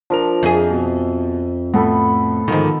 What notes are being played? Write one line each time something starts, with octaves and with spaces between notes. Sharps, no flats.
F3 D4 A#4 F7
F2 G#4 E5
B2
A2 B3 A4 B5
G#2 D3 D#3 F3